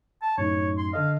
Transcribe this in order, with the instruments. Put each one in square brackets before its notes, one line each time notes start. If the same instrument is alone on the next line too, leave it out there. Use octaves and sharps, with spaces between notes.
[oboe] A5
[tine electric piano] F#2 A2 D#4 [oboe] C#5
[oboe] C6
[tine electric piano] D3 A4 D#5 [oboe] F5